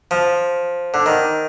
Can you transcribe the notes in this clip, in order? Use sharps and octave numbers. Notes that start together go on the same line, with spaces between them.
F3
D3
D#3